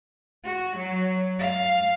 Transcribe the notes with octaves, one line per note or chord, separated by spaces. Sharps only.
F#4
F#3
F5